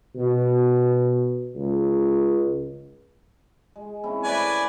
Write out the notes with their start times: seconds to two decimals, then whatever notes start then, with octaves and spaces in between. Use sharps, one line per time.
0.16 B2
1.56 C#2
3.76 G#3
4.04 C4 C#4 E4
4.24 A3 B4 D5 G#5